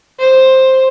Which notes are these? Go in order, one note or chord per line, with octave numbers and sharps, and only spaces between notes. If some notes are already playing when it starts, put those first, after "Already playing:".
C5